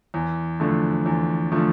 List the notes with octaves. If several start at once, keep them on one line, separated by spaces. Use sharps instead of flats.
E2
D3 F3 A3
E2
D3 F3 A3